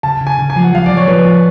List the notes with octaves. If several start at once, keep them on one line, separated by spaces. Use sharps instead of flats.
C#3 A5
C#3
G#5
C#3
G#5
F3
F#5
F3 F5
F3 D5
C#5
F3 B4
F3